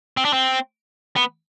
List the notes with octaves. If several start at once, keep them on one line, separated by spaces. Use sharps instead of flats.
C4
D4
C4
B3